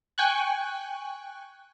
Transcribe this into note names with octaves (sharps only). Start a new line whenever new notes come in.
G5 G#5 C#6 F#6